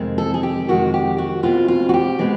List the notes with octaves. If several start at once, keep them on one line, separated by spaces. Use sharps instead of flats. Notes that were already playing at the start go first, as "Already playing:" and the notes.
Already playing: F2 C3 D#3 G#3
A4
G#4
G4
F2 C3 D#3 G#3 F#4
G4
F#4
B2 G#3 C4 F4
F4
F#4
G4
B2 G#3 C4